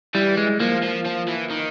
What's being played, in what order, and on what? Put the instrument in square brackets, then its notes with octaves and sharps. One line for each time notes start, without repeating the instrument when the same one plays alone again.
[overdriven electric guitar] E3 [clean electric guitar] G3
[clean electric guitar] G#3
[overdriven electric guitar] F3 [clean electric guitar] A#3
[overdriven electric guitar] F3
F3
E3
D#3